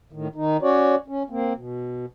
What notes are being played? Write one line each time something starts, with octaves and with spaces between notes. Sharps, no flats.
A2 D#3
D#3 D#4
C#4 F#4 C#5 D5
C#4
A#3 C4
B2